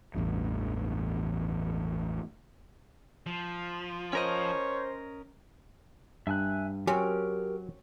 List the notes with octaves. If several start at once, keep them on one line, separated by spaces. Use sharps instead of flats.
A1 E2 G2
F3
C#4 A#4 C5 C#5 D#5
G2 E5 G#5 F#6
F#3 C4 C#4 G4 A#4